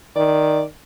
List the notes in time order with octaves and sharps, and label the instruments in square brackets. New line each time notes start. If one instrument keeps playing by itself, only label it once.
[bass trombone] D#3 [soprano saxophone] D5